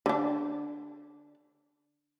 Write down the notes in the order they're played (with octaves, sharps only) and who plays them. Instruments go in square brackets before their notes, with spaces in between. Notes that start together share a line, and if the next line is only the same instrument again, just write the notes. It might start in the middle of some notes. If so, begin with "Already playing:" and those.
[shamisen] D3 D4